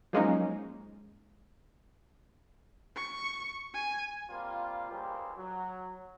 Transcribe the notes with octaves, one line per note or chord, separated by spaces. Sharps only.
F3 F#3 G#3 A#3 C#4 D#4
C#6
G#5
G3 A#3 C4 F4
C#2 G3 A#3 G4 G#4 C5
F#3